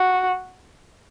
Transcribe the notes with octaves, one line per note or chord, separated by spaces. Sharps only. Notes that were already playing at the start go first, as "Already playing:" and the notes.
Already playing: F#4